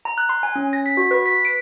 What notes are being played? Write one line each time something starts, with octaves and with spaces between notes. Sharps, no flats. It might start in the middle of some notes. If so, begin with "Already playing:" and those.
A#5
F#6
C6
G#5
C#4
A#6
B6
F#4
B4
B6
D7